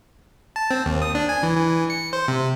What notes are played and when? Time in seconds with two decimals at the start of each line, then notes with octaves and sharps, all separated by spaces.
0.56 A5
0.71 C4
0.86 D#2
1.02 D#6
1.15 D4
1.29 G#5
1.43 E3
1.56 E3
1.90 C#7
2.13 C5
2.28 C3